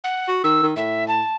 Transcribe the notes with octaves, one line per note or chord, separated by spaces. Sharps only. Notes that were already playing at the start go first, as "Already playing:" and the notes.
F#5
F#4
D#3 E6
D#3
A2 E5
A5